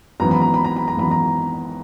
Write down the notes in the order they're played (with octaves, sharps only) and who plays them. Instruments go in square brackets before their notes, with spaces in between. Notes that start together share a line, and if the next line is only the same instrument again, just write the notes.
[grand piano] G#1 F#2 E3 B3 A#5
B5
A#5
B5
A#5
B5
A#5
G#1 F#2 E3 B3 B5
A#5